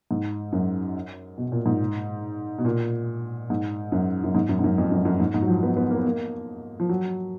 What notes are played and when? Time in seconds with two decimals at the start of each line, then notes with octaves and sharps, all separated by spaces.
0.11 G#2
0.52 F#2
1.38 B2
1.52 A#2
1.66 G#2
2.58 B2
2.65 A#2
3.50 G#2
3.92 F#2
4.24 F#2
4.35 G#2
4.49 F#2
4.59 G#2
4.64 F#2
4.78 F2
4.91 F#2
5.05 F#2
5.20 G#2
5.34 G#2
5.42 F#3
5.48 F3
5.63 B3
5.77 B3
5.90 A#3
5.98 B3
6.06 A#3
6.80 F3
6.89 F#3